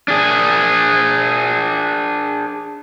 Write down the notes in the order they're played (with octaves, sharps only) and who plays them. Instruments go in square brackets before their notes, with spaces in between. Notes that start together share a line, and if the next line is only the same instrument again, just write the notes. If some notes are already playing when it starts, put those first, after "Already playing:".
[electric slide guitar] D4 G#4